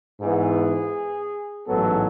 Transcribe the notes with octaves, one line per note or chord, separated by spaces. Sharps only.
G#2 E3 B3 G#4
A1 G#2 F#3 B3 A4